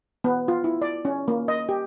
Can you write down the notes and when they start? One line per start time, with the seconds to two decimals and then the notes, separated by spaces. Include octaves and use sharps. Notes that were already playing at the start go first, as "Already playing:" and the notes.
0.24 B3
0.48 F4
0.64 E4
0.82 D5
1.05 C#4
1.28 A#3
1.48 D#5
1.69 G4